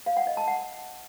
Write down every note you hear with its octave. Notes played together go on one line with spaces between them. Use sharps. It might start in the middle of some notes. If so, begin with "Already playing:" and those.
F5
F#5
D#5
A5
F#5